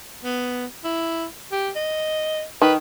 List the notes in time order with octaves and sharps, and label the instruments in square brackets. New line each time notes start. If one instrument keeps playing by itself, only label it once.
[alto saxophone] B3
E4
G4
D#5
[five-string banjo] D#3 [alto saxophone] B4